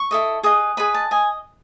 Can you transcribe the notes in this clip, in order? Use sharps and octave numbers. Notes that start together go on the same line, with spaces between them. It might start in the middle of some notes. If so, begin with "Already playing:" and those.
Already playing: C#6
E4 A4 D#5
G#4 B4 D#5 D#6
G#4 B4 D#5 B5
A5
D#5 G#5